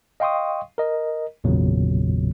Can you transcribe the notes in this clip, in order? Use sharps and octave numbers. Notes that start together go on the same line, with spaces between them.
D#5 F5 G5 C6 C#6 D#6
A#4 D#5
G#1 E2 A#2 C#3 F#3